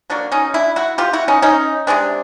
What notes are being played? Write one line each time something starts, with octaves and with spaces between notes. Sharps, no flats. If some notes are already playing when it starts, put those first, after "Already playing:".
D3 F#3 A#3 D4
C#4 D#4
D4 E4
E4 F#4
F4 G4
E4 F#4
C#4 D#4
C#4 D#4
C3 E3 G#3 C4 D4